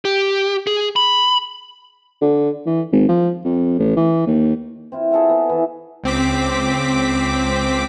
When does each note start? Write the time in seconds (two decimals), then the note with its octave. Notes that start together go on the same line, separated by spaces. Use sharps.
0.05 G4
0.67 G#4
0.96 B5
2.21 D3
2.66 E3
2.92 G#1
3.08 F3
3.44 F2
3.78 A1
3.96 E3
4.26 D#2
4.92 C4 E4 F4
5.11 G#4 A4 E5 F#5
5.29 B3
5.49 E3
6.04 C#2 C4 D6 B6